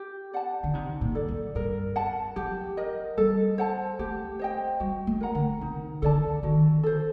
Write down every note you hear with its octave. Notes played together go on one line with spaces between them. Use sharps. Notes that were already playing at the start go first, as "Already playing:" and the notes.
Already playing: G4
D5 F#5 A5
D3
C3 D#4
A#2
A4 D5
F#2
G2 A#4
F#5 A5
F#3 G4
A#4 D#5
G3 A4
C5 F#5 A5
A3 G4
C5 D#5 G5
G3 F#4
A3
A#4 F#5 A#5
D3
C3 D#4
D3 A4 D5 A5
D#3 F#4
A4 C5